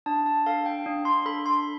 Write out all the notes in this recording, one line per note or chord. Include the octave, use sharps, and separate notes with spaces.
D4 A5
A5
A4 F5
G5
D4
C6
A4 B5
C6